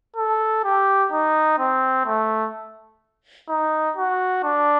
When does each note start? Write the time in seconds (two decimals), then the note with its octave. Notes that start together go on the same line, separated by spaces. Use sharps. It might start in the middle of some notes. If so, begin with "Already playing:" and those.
0.16 A4
0.64 G4
1.12 D#4
1.59 C4
2.06 A3
3.49 D#4
3.97 F#4
4.44 D4